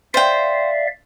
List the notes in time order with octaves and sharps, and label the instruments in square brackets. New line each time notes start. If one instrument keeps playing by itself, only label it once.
[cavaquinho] C5 G5 [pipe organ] D5 E5 F5